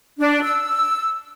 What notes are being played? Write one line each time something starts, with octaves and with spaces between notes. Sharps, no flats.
D4
E6